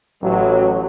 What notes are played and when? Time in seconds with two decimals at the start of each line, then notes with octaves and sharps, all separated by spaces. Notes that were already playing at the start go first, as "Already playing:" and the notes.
0.21 A1 A2 F#3